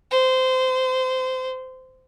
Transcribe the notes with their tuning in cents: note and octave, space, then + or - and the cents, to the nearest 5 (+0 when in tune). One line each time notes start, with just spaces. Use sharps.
C5 -20